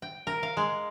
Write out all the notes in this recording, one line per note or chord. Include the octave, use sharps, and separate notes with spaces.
G5
A#4
F5
G#3